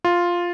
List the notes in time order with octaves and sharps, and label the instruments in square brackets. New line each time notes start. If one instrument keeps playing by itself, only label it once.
[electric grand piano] F4